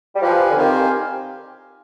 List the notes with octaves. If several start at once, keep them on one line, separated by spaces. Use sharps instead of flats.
G3
F3 G4 B4 F5 G#5
D3
D#3 C4 G4 C5 F5 G#5